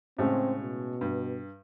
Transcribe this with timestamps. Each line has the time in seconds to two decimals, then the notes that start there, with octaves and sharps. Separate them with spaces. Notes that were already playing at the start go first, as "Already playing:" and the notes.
0.18 A2 C#3 G#3 C4
0.61 B2
1.01 G2